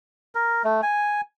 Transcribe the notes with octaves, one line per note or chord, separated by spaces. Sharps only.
A#4
A3
G#5